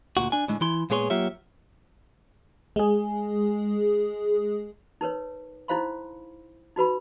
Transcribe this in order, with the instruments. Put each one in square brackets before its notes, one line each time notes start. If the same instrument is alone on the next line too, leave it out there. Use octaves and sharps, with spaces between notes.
[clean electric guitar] D2 A#2 F#4
D4 G#5
A2 D3 G#3
E3 E4 C6
A#2 G#3 B3 G#4 C#5 C6
F#3 A#3 F4 G4 C#5 E5
[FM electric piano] G#3 G#4
[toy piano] D#4 A#4 B4 C#5
D#4 E4 C5 F5 B5 C6
D#4 F#4 B4 B5